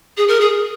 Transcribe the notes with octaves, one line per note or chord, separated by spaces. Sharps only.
G#4
A#4
G#4